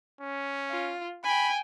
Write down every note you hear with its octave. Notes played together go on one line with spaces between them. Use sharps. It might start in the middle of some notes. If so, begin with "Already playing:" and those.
C#4
F4
G5 G#5 B5